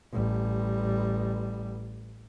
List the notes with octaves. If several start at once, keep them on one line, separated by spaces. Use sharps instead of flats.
A1 G3